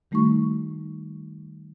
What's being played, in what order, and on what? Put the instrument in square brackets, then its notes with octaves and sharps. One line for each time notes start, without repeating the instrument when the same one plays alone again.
[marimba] D#3 G3 A3 D#4 F#4 C#6